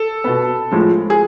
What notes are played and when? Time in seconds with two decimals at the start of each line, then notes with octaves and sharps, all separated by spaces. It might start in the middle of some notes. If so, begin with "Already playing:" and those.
Already playing: A4
0.24 B2 B3
0.71 A2 F3 G#3
1.10 G#4